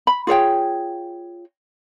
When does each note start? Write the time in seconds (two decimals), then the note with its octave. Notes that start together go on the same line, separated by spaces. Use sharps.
0.07 B5
0.27 F4 G#4 C#5 G5